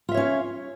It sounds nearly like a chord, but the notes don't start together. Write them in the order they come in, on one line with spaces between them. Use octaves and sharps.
F4 E5 C#5 C#4 F5